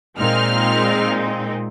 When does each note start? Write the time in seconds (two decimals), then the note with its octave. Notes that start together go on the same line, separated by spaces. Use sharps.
0.18 A#2 G#3 C4 D#4 F6